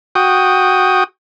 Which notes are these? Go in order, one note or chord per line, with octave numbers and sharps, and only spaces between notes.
F#4 G5 D#6